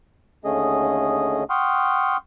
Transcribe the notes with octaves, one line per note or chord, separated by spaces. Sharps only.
D#2 D3 A3 C#4 G#4 D#5
F#5 G5 C6 C#6 D#6 F6